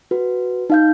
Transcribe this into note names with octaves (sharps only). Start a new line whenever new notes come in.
F#4 B4
D#4 F5 G6